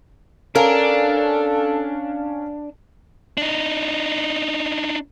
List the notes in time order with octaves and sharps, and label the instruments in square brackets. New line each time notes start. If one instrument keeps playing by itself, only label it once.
[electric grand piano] C#4 F5 G#5 [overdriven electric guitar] D4 [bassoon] A4 [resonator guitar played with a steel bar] A#4
[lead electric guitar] D4 D#4